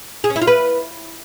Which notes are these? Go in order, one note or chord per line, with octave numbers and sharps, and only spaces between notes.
G#4
C#4
E4
F4
B4